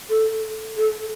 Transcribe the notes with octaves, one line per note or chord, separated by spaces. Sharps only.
A4
A4